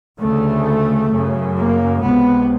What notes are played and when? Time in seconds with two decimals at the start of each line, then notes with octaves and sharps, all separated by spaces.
0.18 D2 C#3 A3
1.11 F#2 C#3
1.57 A#3
2.03 C#2 C3 B3